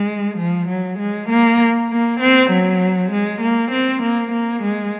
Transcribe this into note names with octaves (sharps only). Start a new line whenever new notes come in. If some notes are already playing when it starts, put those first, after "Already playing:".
Already playing: G#3
F3
F#3
G#3
A#3
A#3
C4
F#3
G#3
A#3
C4
A#3
A#3
G#3